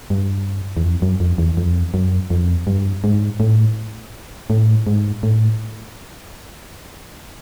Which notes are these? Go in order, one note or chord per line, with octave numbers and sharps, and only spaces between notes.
G2
E2
F2
F#2
F2
E2
F2
F#2
F2
G2
G#2
A2
A2
G#2
A2